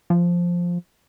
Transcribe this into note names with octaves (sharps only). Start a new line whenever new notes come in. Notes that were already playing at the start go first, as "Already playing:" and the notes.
F3